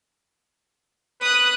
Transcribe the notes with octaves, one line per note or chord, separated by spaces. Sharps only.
B4 D#6 F#6